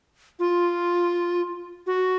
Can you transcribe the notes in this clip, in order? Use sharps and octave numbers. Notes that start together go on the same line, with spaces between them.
F4
F#4